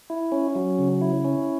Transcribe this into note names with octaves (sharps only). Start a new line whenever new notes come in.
E4
C#4
F#3
C#3
E4
C#4